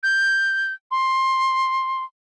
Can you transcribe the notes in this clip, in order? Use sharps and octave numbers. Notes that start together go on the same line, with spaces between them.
G6
C6